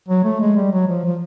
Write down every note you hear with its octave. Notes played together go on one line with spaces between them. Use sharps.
F#3
A3
G#3
G3
F#3
F3
F3